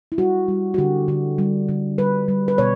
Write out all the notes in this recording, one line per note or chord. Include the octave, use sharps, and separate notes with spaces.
E4
G3 F#4
G3
F#4
D3 G4
D3
G3
D3
G3 B4
G3
B4
B2 C#5